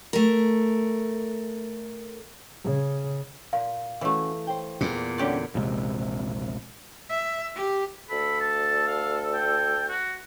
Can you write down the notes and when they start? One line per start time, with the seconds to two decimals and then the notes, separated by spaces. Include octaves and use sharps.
0.13 A3 A#4
2.64 C#3
3.53 A#2 F5
4.01 E3 A3 C#4 F#4
4.47 C5 G5
4.81 E2 A#2
5.18 D3 G3 C#4 G4 D5 F#5
5.55 E1 A#1 C3 G#3
7.09 E5
7.55 G4
8.10 D2 A4 B5
8.40 A5
8.87 F5
9.34 G5
9.89 F#4